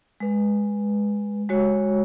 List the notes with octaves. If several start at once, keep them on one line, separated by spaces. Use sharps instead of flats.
G#3 B4
G#3 F#4 C#5